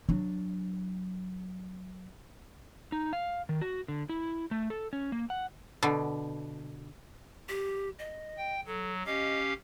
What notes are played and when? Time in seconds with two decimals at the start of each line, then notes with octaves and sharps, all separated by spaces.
0.09 F#3 D4
2.92 D#4
3.13 F5
3.49 D#3
3.61 F#4
3.88 D3
4.09 E4
4.51 A3
4.70 A4
4.93 C#4
5.12 A#3
5.30 F#5
5.83 B2 D3
7.49 G4
7.99 D#5
8.37 G5
8.66 F#3 A4
9.06 C#4 G4 D#5 F5